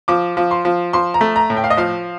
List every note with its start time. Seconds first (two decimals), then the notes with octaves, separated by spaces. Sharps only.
0.08 F3 D6
0.37 F3
0.51 C6
0.65 F3
0.93 F3 C6
1.14 A#5
1.21 A3
1.36 A#5
1.50 A2
1.57 G5
1.64 F5
1.70 D#5
1.77 F3 F5